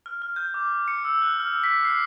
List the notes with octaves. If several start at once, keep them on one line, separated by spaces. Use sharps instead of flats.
F6
F6
G6
D6
C#7
E6
F#6
F6
B6
C7